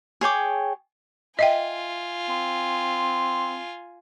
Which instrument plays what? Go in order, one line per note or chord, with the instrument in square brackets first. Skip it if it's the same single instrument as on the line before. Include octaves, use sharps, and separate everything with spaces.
[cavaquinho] G#4 C#5 G5 D6
[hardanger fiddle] F4 G#5 [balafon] D#5 E5 G5
[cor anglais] C4